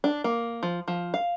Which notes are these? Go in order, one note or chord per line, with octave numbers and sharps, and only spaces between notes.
D4
A#3
F3
F3
F5